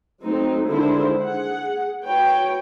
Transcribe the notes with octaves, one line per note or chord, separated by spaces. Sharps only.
F#3 A3 C4 D#4
D3 D#3 G#3 D4 E4 C5
G#4 F#5
F#4 B4 C#5 G5